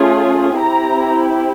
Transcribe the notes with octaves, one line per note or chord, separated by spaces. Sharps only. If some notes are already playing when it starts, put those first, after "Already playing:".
Already playing: A3 C#4 F4 G#4
C4 E4 G4 A#5